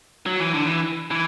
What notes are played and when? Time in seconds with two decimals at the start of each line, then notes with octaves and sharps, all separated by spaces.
0.26 F#3
0.40 E3
0.54 D3
0.67 E3
1.11 E3